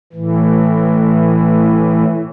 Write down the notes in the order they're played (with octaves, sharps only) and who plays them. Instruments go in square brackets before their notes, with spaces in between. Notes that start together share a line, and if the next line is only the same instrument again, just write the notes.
[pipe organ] A2 E3